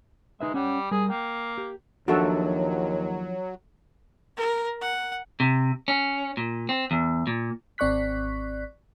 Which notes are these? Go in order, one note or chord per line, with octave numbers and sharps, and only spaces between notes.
G#3 D#4 B4 E5
G3 C#4 C#5 F#5
G3 G#4 A#4
A#3 G5
G4
D#2 F3 F#3 D4 F#4 A4 E5
A#4
F#5
C3
C#4
A#2
C4
E2
A#2
G#1 C4 D5 C#6 F#6 B6